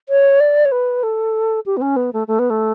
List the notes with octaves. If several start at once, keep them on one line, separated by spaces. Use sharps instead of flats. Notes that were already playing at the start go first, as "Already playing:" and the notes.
C#5
D5
C#5
B4
A4
G4
B3
C#4
B3
A3
A3
B3
A3